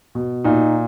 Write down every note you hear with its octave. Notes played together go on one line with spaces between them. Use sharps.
B2
A#2 D#4